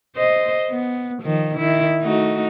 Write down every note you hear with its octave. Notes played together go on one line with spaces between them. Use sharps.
C5 D#5
B3
D#3 F3
D#3 E4
A3 D#4 F#4